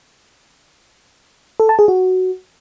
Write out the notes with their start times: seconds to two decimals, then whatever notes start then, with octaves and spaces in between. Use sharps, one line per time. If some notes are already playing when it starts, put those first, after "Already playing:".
1.60 A4
1.69 A5
1.79 G#4
1.88 F#4